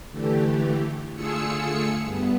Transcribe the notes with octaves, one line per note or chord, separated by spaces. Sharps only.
D3 E3 A3 G4
D3 A3 F4 G#4 E6 C#7
G2 B3